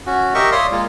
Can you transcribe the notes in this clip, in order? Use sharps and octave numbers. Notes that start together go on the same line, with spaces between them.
C#4 F#4
G4 A#4 D#5 E5 C#6
C#5 D5 E5 F5 C6 D#6
G#3 A#3 F4